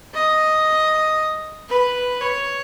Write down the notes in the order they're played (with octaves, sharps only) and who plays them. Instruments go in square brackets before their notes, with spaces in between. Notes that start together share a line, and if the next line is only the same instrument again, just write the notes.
[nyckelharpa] D#5
B4
C#5